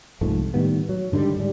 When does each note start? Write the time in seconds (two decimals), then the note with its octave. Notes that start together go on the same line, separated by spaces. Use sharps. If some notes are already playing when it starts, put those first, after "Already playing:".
0.21 C2 G#2 F3 A3
0.54 A2 D#3 G3 B3
0.89 F#3
1.12 G#2 D3 D#3 G3
1.36 G#2 G3